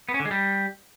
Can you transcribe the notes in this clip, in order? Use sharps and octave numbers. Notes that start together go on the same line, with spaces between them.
B3
C#4
D3
G#3
G3